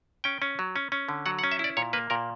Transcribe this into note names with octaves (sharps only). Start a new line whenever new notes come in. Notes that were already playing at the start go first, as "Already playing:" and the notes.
C#4 G5
C#4
F#3
C#4
C#4
D3
F#3 F#5
F#5
C#4
E5
E4 D5
A#2 C#5
A#3 B4
A#2 A#4